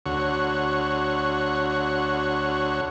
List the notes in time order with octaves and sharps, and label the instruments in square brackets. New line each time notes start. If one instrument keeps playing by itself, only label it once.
[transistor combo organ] D2 F#4 C#5